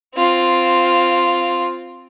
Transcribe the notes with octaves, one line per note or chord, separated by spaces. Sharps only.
C4 F4